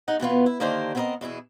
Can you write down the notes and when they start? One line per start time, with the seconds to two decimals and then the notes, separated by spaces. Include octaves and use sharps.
0.08 D#4 G#4 F#5
0.20 B2 E3 B3 F4
0.46 E4
0.60 D3 D#3 A#3 D4 G4 C5
0.95 B3 C4 E4 G#4 A#4 D#5
1.21 E2 B2 E4 G#4